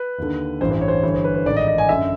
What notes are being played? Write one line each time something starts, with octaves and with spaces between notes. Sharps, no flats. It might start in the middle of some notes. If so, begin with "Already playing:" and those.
Already playing: B4
D#2 D3
A1 G2 E3 C5
C5
C#5
C5
C#5
G1 G2 E3 C#5
C5
B4
C5
A1 G#2 D#3 D5
D#5
D#5
G#5
F#2 D3 E5